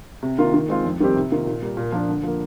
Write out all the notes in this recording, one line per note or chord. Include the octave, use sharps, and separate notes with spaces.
C3
D#3 A#3 F4
D#3
G#3 C4 F4
F2
D#3 G3 C4 G4
C3
D#3 A#3 F4
A#2
G3 A#3
A#2
F3 A#3 D4
D3
F3 A#3